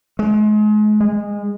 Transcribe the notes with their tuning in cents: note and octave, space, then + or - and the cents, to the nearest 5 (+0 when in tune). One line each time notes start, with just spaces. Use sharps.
G#3 +35
G#3 -20